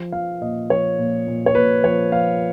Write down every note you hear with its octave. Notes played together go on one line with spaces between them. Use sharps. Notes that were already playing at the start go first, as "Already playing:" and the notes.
Already playing: F3
F3 F5
A#2 D#5
F3 C#5
A#2
A#2
C#5
A#2 B4
F3 C#5
F3 F5